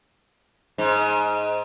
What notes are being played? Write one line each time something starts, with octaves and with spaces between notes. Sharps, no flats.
G#2